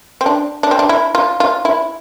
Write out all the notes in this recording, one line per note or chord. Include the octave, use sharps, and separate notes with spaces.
C4
D4
D4
C4
D4
E4
F4
F4
E4